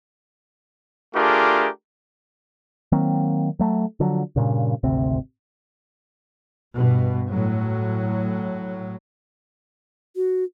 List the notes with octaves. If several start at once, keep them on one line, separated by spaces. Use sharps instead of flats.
A3 D4 F4 G4 G#4 A#4
D#3 F#3 A#3 C4
F#3 A3
D3 F3 F#3
G2 A#2 C#3
G#1 D2 C3 C4
G2 B2
A2 F#3
F#4